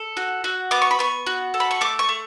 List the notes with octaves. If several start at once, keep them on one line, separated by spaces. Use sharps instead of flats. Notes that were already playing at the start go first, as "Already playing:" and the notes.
Already playing: A4
F#4
F#4
B3 D6
C#6
B5
B3 C#6
F#4
A4
B5
C#6
A3 D6
C#6
A3